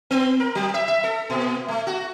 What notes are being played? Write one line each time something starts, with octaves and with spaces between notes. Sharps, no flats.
B3
A#4
F#3
E5
E5
A4
A#2
A3
F#4